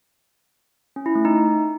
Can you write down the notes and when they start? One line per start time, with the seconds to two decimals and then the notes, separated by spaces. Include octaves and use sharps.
0.96 C#4
1.06 E4
1.15 A3
1.25 D#4